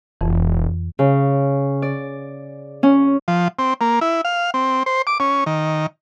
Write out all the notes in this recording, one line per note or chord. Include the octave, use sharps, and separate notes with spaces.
E1 F2 E3
C#3
D5
C#4
F3
C4
A#3
E4
F5
C4
C5
D6
C#4
D#3